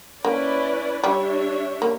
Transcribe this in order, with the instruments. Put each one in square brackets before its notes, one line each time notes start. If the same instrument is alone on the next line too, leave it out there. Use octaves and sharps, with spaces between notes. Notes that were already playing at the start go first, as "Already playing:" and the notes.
[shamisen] A#3 [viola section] C#4 E4 B4 D5
[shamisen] G3 [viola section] D4 G4 C#5 E5
[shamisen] A#3